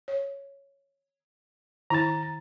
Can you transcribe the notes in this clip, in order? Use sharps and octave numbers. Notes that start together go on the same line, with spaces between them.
C#5
D#3 E4 A#5 B5 A6